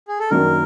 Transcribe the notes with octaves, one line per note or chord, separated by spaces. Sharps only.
G#4
A4
F#2 D#3 F#3 A#3 D4 A#4